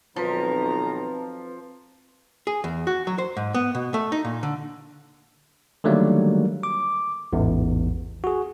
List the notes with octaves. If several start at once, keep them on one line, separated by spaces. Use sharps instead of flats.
B1 D#3 F3 C4 B4 A#5
G#4
E2
F#4
F#3
C5
G#2
B3
B2
A3
D#4
A#2
D3
D3 D#3 F#3 G3 A3 A#3
D6
A1 E2 G#2
F#4 G#4